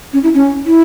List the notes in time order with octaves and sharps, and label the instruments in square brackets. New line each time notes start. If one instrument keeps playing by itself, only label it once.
[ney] C#4
E4
C#4
E4